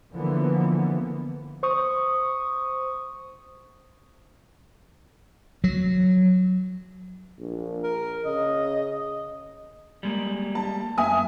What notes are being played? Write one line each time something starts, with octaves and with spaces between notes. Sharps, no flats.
D3 E3 F3 A#3 B3
C5 C#6 D#6
F#3
A#1
A#4
C#3 D#5
G3 G#3 A#3
A5
F#2 E5 G#5 D#6